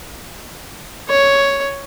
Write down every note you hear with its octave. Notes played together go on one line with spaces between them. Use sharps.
C#5